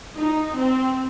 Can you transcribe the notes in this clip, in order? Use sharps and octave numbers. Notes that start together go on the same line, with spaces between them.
D#4
C4